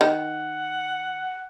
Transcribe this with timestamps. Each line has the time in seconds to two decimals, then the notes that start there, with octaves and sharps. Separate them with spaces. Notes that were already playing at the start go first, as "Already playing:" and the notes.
0.01 D#3 F#5